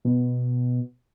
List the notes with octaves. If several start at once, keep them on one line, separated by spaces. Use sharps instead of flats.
B2